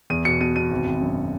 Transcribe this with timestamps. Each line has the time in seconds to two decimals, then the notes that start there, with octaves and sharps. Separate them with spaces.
0.10 E2 D#7
0.25 B2 C#7
0.41 B2 D#7
0.56 B2 D#7
0.71 G#1
0.86 G#1
1.01 F#2